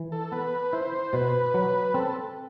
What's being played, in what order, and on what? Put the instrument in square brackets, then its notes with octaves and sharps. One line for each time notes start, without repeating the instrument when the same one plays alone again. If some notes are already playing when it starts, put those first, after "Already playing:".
Already playing: [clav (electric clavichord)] E3
[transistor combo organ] A4
[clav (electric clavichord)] B3 [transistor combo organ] B4
[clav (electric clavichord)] E4 [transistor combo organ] C5
[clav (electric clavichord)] B2 [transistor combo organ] B4
[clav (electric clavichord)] F#3
[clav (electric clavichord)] C4 [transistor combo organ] A4